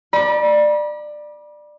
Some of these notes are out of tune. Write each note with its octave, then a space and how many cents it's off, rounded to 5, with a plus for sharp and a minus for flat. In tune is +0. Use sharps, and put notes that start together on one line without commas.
D5 +20 B5 -40